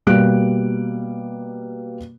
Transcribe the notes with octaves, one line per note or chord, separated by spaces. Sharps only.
B2 G3 A#3 F#6 D7